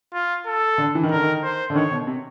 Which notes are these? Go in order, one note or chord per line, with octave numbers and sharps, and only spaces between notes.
F4
A4
D3
E3
D#3
D3 A#4
D#3
C5
D3
D#3 C#5
B2
C3